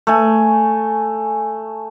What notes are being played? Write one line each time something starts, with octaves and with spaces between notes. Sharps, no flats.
A3 G#5